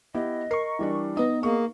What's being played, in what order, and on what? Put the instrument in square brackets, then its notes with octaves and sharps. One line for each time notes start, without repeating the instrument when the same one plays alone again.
[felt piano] B3 E4 G4 [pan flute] D#5
[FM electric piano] A#4 C#6 [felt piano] C7
[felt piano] E3 G3 D4
[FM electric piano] B3 D#4 [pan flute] D#5 [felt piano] D#6
[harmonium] A#3 [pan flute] G#4 [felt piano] C#6